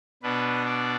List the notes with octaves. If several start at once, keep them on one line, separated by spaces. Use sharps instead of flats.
B2 B3 D4 B4
D5